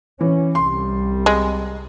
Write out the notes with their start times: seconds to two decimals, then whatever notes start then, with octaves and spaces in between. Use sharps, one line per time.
0.21 E3 C#4
0.55 C2 G3 C6
1.26 G#3